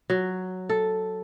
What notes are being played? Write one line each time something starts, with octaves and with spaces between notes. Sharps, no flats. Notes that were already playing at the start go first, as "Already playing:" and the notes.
F#3
A4